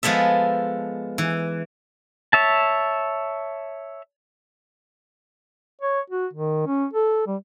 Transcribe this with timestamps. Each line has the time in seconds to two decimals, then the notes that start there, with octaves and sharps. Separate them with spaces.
0.03 F3 G#3 B3 A4 E5
1.18 E3
2.33 C#5 E5 A5
5.82 C#5
6.10 F#4
6.33 D#3
6.67 C#4
6.93 A4
7.27 G3